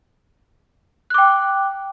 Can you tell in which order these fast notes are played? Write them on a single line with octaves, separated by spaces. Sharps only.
F#6 D6 G5